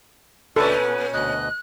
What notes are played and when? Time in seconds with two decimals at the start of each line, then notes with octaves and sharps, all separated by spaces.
0.56 D2 A#2 C#4 D4 A4 B4 E5
0.82 B3
1.13 D2 B2 D#5 F#6